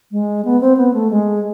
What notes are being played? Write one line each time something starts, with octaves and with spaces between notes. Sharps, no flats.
G#3
B3
C4
B3
A3
G#3